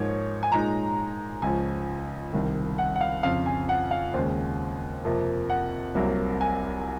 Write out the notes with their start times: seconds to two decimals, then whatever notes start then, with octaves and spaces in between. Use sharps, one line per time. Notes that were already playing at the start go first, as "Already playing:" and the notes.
Already playing: G#2 F3 A#3 D#4 C#5
0.43 G#5
0.51 A#2 G#3 D#4 A#5
1.42 C#2 C#3 F3 G#5
2.33 C2 C3 D#3
2.78 F#5
2.96 F#5
3.01 F5
3.23 F2 C#3 F3 C4 F5
3.46 G#5
3.69 F#5
3.91 F5
4.14 D#2 C#3 G#3 C5
5.05 F2 C3 F3 A#3
5.50 F#5
5.95 C2 C3 F#3 A#3
6.41 G#5